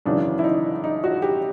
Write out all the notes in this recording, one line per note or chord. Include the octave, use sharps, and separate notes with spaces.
G#1 F#2 C#3 E3 D4
E4
D#4
D#4
F#4
G4